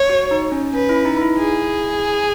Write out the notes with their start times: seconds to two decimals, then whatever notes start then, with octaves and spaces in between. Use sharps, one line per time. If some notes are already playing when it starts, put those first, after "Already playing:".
Already playing: C#5
0.09 F#4
0.31 D#4
0.52 C#4
0.73 C#4 B4
0.89 E4
1.05 D#4
1.17 D#4
1.22 E4
1.37 G#4